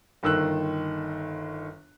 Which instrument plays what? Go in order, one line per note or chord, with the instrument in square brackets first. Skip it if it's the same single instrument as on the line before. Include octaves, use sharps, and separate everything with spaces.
[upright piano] G1 D#3 E6 F#6